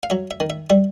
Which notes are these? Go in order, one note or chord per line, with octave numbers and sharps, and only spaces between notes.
F5
F#3 E5
E5
D#3
E5
G3 E5